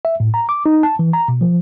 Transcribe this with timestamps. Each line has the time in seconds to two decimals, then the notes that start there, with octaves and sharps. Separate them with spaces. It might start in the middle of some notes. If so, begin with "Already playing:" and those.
0.05 E5
0.20 A2
0.34 A#5
0.49 D6
0.66 D#4
0.83 A5
0.99 E3
1.13 A#5
1.28 B2
1.41 F3